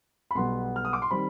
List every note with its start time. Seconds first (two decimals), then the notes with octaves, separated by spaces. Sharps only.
0.31 B5
0.35 B1 B2 G3 B3 C6
0.76 F6
0.85 D#6
0.93 D6
1.02 C6
1.11 D#3 G3 C4 B5